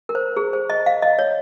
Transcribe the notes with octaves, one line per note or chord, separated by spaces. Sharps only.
A#4
C5
G#4
C5
D#5
F5
D#5
C#5